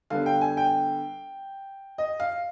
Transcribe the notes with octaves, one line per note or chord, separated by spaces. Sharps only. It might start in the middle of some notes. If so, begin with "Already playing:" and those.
D3 G3 B3 F5
G5
G#5
G5
D#5
F5